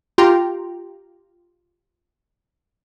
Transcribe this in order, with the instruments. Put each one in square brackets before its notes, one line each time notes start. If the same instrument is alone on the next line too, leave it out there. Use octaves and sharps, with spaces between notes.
[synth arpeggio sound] F4 G4 G5 A#5 C6